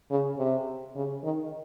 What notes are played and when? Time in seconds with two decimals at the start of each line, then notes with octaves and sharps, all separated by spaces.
0.10 C#3
0.38 C3
0.95 C#3
1.23 D#3